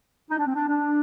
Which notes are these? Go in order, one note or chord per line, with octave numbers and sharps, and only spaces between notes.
D#4
D4
C4
D4
D4